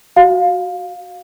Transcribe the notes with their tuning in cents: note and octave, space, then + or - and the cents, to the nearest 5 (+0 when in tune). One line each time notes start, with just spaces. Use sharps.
F#4 +0 F5 +15